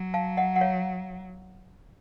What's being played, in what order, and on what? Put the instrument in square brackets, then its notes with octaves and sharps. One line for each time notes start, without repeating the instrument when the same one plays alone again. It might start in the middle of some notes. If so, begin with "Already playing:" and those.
Already playing: [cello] F#3
[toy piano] F5 A5
D#5 F#5
F#5
C#5 F5